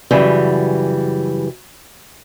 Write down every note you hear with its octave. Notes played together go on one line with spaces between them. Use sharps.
F#2 C#3 E3 G3